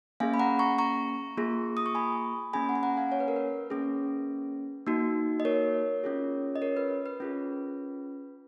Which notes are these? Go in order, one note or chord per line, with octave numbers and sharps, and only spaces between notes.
A#3 C#4 G#4 F5 G#5
B5
F#5 A#5
A#5 C#6
A#5 C#6
A#3 F4 G#4
D#6
C#6
G#5 B5
A#3 C#4 G#4 G#5 B5
F#5
G#5
F#5 A#5
F5 G#5
C#5
B4
A#4
B4
A#3 C#4 G#4
A#3 D#4 F#4
D#5
A#4 C#5
C#4 F4 G#4
D#5
A#4 C#5
B4
B4
C#4 F4 G#4